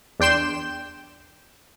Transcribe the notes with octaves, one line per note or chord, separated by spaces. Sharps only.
E2 D4 G5 C6 E7